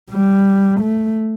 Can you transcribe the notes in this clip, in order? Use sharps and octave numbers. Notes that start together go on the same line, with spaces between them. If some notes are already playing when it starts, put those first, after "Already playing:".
G3
A3